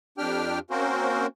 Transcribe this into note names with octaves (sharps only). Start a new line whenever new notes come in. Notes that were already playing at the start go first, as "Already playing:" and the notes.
F2 D4 G4 G5 F6
A#3 C4 C#4 F#4 A#4 C5